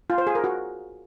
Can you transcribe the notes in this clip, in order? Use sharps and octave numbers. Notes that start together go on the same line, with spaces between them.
F4
C5
G#4
A#4
F#4